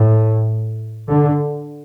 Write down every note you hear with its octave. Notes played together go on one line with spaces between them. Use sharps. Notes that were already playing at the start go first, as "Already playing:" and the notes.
Already playing: A2
D3